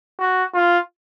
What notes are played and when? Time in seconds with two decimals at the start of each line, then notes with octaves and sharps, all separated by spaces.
0.19 F#4
0.54 F4